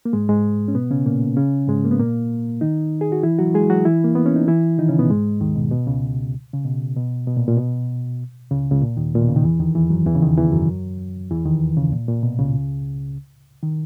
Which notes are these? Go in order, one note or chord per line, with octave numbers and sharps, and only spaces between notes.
A#3
G#2 G#3
G#2 G#3
C#4
B2 B3
C#3 C#4
A#2 A#3
C#3 C#4
G#2 G#3
A#3
B3
A#2 A#3
D#3 D#4
G#4
F#4
E3 E4
F#3 F#4
G#3 G#4
F#3 F#4
E3 E4
A#3
B3
C#4
D#4
E3 E4
D#3 D#4
C#3 C#4
B2 B3
G#2 G#3
D#2 D#3
B2
B2
C#2 C#3
C#3
B2
B2
B2
A#2
A#2
B2
C#2 C#3
C#2 C#3
A#2
D#2 D#3
A#2
B2
C#3
D#3
E2 E3
D#2 D#3
E2 E3
F#2 F#3
E2 E3
C#3
D#2 D#3
E2 E3
F#2 F#3
E2 E3
D#2 D#3
C#2 C#3
A#2
A#2
B2
C#2 C#3
D#3